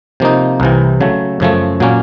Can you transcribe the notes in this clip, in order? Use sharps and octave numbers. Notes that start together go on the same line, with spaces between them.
C3 F3 A#3 D#4
C2 C3 E3
C#3 F#3 A3
F#2 C#3 F3 A3
A#2 F#3 A#3 C#4